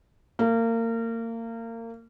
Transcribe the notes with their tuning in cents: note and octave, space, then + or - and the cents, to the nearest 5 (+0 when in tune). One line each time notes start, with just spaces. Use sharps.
A#3 -30